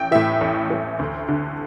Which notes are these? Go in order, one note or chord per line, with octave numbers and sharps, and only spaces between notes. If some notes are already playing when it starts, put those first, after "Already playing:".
Already playing: A1 G5
A2 E3 E5
A1
A2 E3
D2
D3